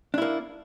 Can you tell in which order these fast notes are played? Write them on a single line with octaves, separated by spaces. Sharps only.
D4 E4 A#3